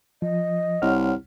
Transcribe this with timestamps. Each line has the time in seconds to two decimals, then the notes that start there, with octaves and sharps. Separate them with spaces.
0.22 F3 D#5
0.82 C2 C#5 F#5 F6